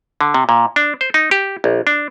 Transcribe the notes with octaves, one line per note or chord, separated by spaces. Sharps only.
D3
C3
A#2
D4
C5
D#4
G4
A#1
D4